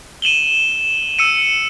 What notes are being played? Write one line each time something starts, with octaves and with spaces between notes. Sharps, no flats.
D#7 E7 F#7 G7
E6 C#7 D#7